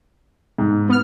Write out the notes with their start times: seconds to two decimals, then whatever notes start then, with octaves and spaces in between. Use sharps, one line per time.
0.58 G#2
0.89 B3 F6